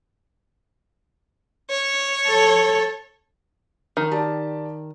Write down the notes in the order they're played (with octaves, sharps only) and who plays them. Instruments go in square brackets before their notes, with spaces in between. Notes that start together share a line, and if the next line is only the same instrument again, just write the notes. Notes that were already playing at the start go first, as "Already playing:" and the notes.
[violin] C#5
[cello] A4
[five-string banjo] D#3
[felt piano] G4 D5 A5